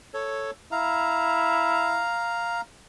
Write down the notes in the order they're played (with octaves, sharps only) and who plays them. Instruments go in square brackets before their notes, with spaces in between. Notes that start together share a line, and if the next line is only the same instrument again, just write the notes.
[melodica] A4 C#5
[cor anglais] E4 [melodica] F5 A#5